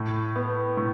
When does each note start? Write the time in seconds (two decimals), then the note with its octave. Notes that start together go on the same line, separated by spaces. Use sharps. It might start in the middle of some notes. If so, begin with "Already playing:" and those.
Already playing: A2
0.36 B3
0.77 A2